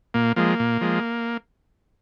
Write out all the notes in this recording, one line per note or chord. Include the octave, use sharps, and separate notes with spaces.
A#2 A#3
F3 G#3 A#3
A#2
F3 G#3